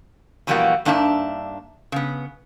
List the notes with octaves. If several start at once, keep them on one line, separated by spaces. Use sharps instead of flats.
B2 E3 F3 G3 A#3 F#4
G2 A#3 D4 D#4 E5 A5
C#3 B3